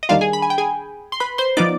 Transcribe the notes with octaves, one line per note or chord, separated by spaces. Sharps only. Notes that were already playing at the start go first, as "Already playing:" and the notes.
D#5
D#2 D#3 G3 D4 F4 F5
G#4 G#5
B5
G#5
G5
G#4 G#5
C6
B4 B5
C5 C6
F3 B3 D#4 D5 D6